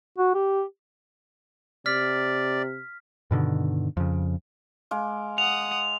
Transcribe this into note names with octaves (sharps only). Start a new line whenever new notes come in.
F#4
G4
C3 D5 F6 B6
G2 B2 D3 D#3
F2 C#3
G#3 F5 D6
F#5 D#6 F7